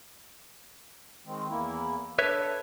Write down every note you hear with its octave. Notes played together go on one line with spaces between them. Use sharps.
D#3 G#3 C4
E2 A#3 E4
D4 A4 B4 C#5 E5